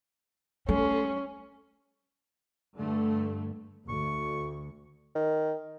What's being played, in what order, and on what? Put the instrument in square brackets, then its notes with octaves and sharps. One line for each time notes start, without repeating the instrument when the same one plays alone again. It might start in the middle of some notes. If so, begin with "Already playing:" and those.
[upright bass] G3 [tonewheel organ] A3 A4 C6 [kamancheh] C#4
[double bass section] G2 D3 A3
[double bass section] D2 [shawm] C#6
[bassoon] D#3